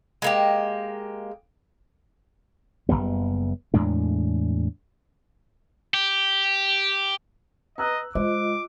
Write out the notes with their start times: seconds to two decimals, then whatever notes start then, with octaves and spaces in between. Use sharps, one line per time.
0.22 G#3 A#3 G4
2.89 F#1 D#2 G3 B3
3.74 E2 A2 G#3 D4
5.94 G4
7.78 B4 D#5 A#5 E6 F#6
8.15 G#3 F4 C5 D#5 D6